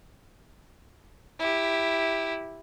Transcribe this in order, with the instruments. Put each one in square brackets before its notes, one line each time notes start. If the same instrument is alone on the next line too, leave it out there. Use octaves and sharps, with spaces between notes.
[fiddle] E4 G4